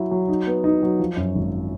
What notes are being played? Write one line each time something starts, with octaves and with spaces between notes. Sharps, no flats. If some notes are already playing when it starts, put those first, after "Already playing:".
Already playing: F#3 E4
F#3
D#4
B3
D#4
F#3
F3
F#2
G#1